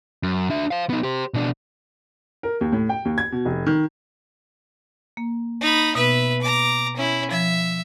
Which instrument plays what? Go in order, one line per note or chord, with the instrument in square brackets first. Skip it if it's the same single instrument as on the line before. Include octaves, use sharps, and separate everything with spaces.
[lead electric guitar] F#2
D4 E5
C5 F5
B3 D#4
G4 C5
B2 D4
[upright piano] A#4
D#2
A2
G5
D#2
G#6
B2
F1
D#3
[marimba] A#3
[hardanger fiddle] D#4 B5
[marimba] B2 B3 [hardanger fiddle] B4 E5
[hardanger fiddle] A#5 D6
C#4 E4
[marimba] F3 G#6 [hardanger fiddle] E5